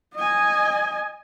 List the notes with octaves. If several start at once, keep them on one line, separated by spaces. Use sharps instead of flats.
D#5 G#5